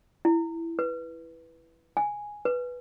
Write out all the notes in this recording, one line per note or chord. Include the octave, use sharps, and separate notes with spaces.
E4
B4
G#5
B4